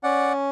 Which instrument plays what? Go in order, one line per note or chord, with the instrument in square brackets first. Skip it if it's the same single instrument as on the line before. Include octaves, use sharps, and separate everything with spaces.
[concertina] C#4 D5 F#5